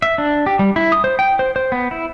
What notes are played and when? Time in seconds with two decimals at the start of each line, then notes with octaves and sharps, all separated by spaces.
0.02 E5
0.18 D4
0.46 G4
0.59 G3
0.76 E4
0.92 D#6
1.04 C5
1.19 G5
1.39 C5
1.56 C5
1.72 B3
1.91 E4